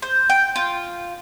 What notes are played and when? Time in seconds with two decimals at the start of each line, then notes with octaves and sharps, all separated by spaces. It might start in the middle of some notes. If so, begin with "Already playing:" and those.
0.02 C5
0.30 G5
0.56 F4